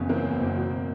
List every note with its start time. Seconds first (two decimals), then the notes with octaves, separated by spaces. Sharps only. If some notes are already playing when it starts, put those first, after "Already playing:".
Already playing: F#1 E2 C#3 B3 C#4
0.09 E3 A#3 C4
0.25 E2
0.41 F#1
0.57 B2